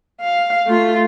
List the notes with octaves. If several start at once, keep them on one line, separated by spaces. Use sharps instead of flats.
F5
A3 F4